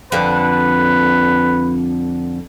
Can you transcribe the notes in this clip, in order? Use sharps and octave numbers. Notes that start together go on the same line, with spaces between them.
F2 D3 B4